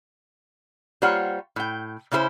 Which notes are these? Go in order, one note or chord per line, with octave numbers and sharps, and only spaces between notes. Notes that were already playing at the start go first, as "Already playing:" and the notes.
G3 A#3 F4 C5 C#5 F#5
A2 G5
C#3 C#4 E4 G#4 C5